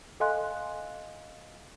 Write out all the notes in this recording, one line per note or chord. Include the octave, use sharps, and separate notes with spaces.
A4 D#5 F5 G#5 C6 F#6